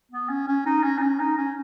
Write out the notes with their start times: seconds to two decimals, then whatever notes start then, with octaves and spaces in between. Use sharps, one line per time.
0.11 B3
0.29 C#4
0.48 C#4
0.66 D#4
0.83 C#4
0.98 D#4
1.02 C#4
1.20 D#4
1.38 C#4